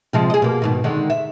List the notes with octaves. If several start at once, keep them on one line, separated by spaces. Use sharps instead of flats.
C3 F3 G#3
G#4 D#5
B2 A#3
G#2 B2 D#3
D3 D#3 G#3
E5